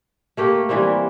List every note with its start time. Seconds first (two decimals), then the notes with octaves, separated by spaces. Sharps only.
0.37 A3 A#3 G4
0.69 E3 G3 A#3 C4